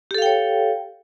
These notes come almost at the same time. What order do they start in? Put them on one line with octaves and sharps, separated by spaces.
G4 A4 F5 G5 C#5